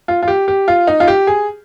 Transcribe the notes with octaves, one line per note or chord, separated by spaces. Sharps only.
F4
F4
G4
G4
F4
D#4
F4
G4
G#4